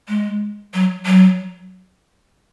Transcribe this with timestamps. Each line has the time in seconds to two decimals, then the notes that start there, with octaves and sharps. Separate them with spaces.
0.09 G#3
0.74 F#3
1.06 F#3